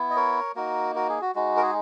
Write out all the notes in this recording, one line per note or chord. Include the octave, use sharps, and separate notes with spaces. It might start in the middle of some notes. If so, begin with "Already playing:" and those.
Already playing: B3 E4
D#5
A#4 C#5
A#3 D#4 F#4 A#4
F#4 A#4
G#4
F#4
G#3 D#4 F#4
A#4
G#4